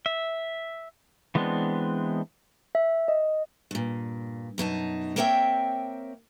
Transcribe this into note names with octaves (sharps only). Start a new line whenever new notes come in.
E5
E3 G#3 B3 C4 D4
E5
D#5
G2 A#2
F#2 B2 D#4 A5
A#3 C4 A#4 C#5 E5 G5